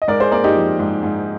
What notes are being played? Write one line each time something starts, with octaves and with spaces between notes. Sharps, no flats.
D#5
G#2 A#4 D5
G#4 C5
A#3 A#4 D5
D#4 G4
F3
G#2
G#2